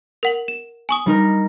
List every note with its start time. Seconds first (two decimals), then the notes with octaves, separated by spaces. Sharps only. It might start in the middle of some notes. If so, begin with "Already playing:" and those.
0.23 A#4 F#5 F#7
0.48 E7
0.89 G#5 C#6 D#6
1.06 G3 D#4 A#4